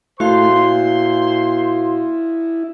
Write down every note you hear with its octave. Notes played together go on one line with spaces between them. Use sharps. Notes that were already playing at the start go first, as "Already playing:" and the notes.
A#2 A3 E4 F#4 C5 F5 C6
E4